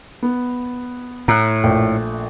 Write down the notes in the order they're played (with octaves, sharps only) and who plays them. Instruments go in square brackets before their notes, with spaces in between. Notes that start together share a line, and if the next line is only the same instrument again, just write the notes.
[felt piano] B3
[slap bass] A2 [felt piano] A#5 F#6
[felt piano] A#1 A3 G5